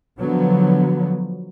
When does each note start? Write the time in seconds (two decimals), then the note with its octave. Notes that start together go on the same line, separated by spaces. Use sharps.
0.21 D3 F3 F#3 B3